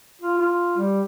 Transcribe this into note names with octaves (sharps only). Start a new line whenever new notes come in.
F4
F4
G3